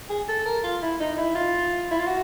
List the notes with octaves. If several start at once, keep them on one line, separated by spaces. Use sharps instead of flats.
G#4
A4
A#4
F4
E4
D#4
E4
F4
E4
F4
F#4